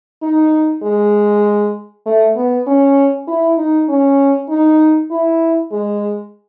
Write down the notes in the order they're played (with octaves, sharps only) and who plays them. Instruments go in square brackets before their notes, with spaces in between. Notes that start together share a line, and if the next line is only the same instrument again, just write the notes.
[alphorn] D#4
G#3
A3
B3
C#4
E4
D#4
C#4
D#4
E4
G#3